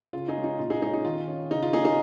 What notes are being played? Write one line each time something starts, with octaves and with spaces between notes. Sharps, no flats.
C#3 F4
D#4 G#4
G#3 C#4
D#4
A#2 F4
D#4 G#4
G#3 D#4 G#4
C#4
D#4
D#3 F4
C#4
C#3 D#4
F4
A#3 C#4 D#4 G#4
D#4 G#4